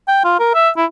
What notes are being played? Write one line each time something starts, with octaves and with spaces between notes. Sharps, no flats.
G5
F4
A#4
E5
E4